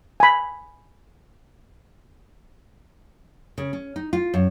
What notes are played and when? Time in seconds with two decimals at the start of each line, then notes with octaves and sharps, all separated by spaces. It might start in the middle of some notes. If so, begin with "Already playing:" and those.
0.20 G#5 B5
3.58 C#3
3.73 C#4
3.96 D#4
4.13 F4
4.34 F#2